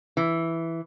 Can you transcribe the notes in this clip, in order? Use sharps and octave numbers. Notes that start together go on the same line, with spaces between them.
E3